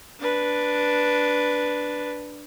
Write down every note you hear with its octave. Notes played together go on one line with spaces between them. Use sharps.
D4 B4